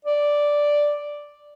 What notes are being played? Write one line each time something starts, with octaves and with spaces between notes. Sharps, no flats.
D5